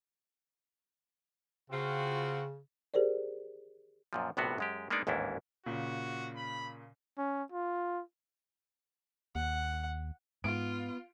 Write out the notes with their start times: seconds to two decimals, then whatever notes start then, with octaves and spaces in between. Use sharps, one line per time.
1.70 C#3 C4 F4 F#4
2.94 G4 G#4 A#4 C5 D5
4.13 F#2 A#2 F3
4.37 A#1 A2 C3 B3 F#4
4.58 F#2 G#3 G4
4.90 G#3 A#3 B3 D4 D#4 D5
5.07 A1 D#2 G#2 C#4 D4 E4
5.66 A#2 C#3 F#4
6.36 B5
7.18 C#4
7.52 F4
9.35 D#2 F#5
10.44 G#2 B3 F4 D7